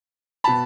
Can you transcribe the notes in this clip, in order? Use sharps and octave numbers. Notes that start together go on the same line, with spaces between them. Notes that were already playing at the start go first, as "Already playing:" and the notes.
B2 A5 B5